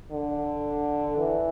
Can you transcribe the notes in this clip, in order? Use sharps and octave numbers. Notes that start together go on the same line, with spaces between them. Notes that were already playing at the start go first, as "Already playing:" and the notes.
D3
E3